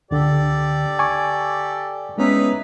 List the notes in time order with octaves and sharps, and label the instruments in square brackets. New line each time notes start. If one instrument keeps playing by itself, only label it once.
[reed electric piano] C#2 D3 [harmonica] G4 A4 D5
[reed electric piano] G#5 C#6 D6
[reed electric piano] G#3 B3 C#4 [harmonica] D#4 E4 B4